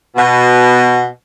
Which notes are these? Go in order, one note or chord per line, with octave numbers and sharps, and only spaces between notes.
B2